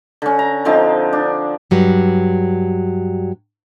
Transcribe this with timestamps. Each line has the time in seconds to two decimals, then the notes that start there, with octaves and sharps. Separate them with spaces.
0.22 D3 C#4
0.39 A#5
0.65 D3 F3 C4 D#4
1.13 D4
1.71 G2 F#3 G3